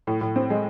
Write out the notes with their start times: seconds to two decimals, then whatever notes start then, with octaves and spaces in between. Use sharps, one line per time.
0.07 A2
0.21 A2
0.36 C4
0.50 G#3